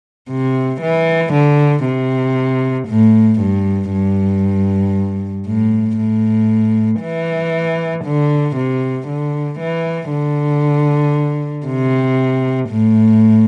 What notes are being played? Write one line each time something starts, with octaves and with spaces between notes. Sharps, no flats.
C3
E3
D3
C3
A2
G2
G2
A2
A2
E3
D3
C3
D3
E3
D3
C3
A2